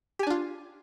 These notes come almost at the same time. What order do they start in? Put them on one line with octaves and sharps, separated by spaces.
G4 G#5 D4 F4